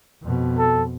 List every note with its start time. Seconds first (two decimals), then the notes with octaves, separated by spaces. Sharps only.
0.22 F2 B2
0.58 A4